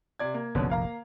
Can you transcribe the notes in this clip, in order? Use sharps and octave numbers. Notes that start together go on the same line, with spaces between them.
C3 D5 G#6
A#3
F1 A#1 F2 B2 D3 C#4
A#3 F5 A#5